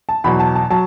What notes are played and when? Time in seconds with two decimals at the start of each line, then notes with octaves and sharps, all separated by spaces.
0.09 A5
0.24 E2 B2 F#3 B5
0.40 A5
0.56 A5
0.70 F#3 A5